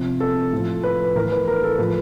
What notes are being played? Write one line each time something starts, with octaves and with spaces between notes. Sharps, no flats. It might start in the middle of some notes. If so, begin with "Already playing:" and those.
Already playing: C3 F3
A4
A2 F3
B4
A2 E3 A#4
B4
A#4
A4
A2 F3 B4